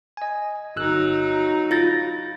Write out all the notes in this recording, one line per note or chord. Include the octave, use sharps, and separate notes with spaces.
D#5 G#5
G1 F#3 D#4 E6 F#6
F4 F5 G6 A6 A#6